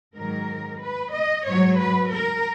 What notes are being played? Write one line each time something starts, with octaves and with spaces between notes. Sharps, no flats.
G#2 D#3 F#3 A#4
B4
D#5
G#2 F#3 C#5
B4
A#4